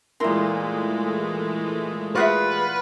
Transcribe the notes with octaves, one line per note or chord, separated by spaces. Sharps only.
A#2 E3 G#3 A3 E4 A#4 C6
F4 F#4 G#4 B4 E5 F#5